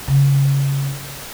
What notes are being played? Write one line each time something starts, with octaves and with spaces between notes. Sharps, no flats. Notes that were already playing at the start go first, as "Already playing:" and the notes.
C#3